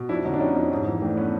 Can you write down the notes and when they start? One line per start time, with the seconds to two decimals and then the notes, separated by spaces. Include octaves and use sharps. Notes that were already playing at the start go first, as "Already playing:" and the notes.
Already playing: B2
0.09 F2 D4 E4
0.25 D3 C#4 D#4
0.34 D4
0.40 G3 C#4 D#4
0.56 F2
0.71 G#2
0.87 E3
1.02 A3 C4 D4
1.17 B3 C#4